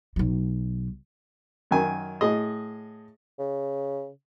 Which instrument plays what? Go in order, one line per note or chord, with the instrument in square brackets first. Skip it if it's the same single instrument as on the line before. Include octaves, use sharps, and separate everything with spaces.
[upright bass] B1 F#3
[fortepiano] F#2 D#3 G#5
A2 G#4 D#5
[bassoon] C#3